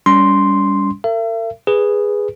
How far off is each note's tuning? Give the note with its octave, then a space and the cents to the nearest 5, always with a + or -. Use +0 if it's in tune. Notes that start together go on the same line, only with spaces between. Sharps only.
G3 +20 C#4 +40 C6 +0
A#4 -45 E5 +40
G#4 -10 B4 +0